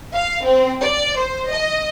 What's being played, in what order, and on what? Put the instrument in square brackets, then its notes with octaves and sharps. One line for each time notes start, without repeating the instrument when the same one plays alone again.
[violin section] F5
C4
D5
C5
D#5